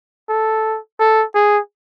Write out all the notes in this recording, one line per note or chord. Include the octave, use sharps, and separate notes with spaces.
A4
A4
G#4